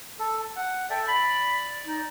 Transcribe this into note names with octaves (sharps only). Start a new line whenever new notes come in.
A4
F#5
A4 D5 E5 G5
D5 B5
D#4